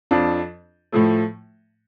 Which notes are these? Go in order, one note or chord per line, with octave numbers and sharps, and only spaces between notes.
F2 F3 D4 F4
A2 F3 A3